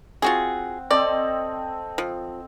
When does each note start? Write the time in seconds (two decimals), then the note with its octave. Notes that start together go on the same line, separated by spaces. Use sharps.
0.22 C4 F4 F#4 G#4 F#5
0.91 C4 A4 D5 D#5
1.98 F3